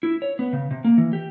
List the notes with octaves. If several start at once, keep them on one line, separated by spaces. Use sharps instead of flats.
E4
C#5
B3
C#3
C3
A#3
E3
G4